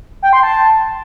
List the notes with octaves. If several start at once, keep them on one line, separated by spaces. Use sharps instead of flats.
G5
C6
A5